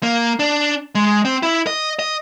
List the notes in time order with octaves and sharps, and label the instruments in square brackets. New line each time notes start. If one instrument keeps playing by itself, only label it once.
[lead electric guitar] A#3
D4
G#3
C4
E4
D#5
D#5